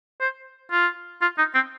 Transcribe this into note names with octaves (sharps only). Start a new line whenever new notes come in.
C5
F4
F4
D#4
C4